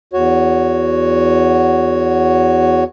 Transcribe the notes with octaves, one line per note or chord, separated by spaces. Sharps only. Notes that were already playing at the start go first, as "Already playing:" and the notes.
E2 F#4 C#5